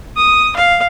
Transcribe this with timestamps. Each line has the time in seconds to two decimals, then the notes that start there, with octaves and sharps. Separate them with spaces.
0.16 D#6
0.56 F5